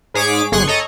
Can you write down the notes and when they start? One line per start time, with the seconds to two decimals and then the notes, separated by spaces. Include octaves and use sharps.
0.14 G#2 G#4 C#5 D6 B6 D7
0.52 G1 G#4 C6 C#6 F#6
0.68 A4 C#5 D#5 A#5